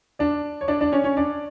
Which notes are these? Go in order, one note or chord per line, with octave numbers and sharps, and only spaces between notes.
D4 D5
C#5
D4 D5
D4 D5
C#4 C#5
C#4 C#5
D4 D5